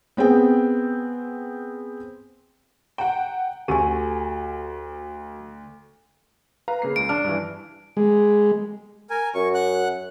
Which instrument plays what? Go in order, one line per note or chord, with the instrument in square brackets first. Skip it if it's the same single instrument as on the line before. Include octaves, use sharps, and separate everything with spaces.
[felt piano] B3 C4 G#4 G5
[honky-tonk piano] F#5 G5 [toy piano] A#5
[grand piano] D2 [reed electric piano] F#4 A4 [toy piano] G4 G#5 [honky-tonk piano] D#7
[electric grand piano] B4 F5 A#5
C#3 A#3 C7
[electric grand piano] C#2 [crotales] D7
[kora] D4 [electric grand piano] F6
[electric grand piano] G2 E3
[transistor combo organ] G#3
[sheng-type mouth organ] A#4 G#5
[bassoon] F#2 [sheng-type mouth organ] C#6
[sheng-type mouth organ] F#5 F#6